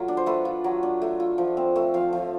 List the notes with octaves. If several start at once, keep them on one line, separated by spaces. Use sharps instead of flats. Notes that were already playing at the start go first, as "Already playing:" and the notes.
Already playing: F#3 A3 F4
D4
C5
A3 B4
F4
F#3
D4
A3
F4
F3
C4
A3
F3 F5
F3